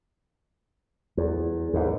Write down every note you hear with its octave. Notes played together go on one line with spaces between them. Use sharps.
E2
D#2 G#2